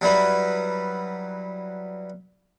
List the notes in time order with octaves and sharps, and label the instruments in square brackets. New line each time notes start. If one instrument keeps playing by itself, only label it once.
[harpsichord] F#3 G3 E4 B4